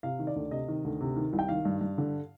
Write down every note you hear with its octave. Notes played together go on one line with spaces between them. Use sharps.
C3 F5
D#3
D5
D2
C3 D#5
D#3
D2
C3
D#3
C2
G5
D#3 F5
G2
G2
D3